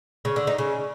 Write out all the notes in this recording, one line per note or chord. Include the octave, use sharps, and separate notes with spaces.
C#3
D3
D#4
C#3